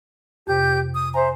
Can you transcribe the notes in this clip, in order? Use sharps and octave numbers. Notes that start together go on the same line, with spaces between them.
F2 C3 G4 G6
D#6
C5 E5 G#5 A#5